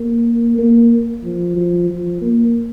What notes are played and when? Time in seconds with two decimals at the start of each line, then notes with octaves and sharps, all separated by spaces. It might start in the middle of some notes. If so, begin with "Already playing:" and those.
Already playing: A#3
0.58 A#3
1.24 F3
1.56 F3
1.90 F3
2.21 A#3